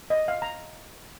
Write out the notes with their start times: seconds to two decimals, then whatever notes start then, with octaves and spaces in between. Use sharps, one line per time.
0.10 D#5
0.28 F5
0.42 A#5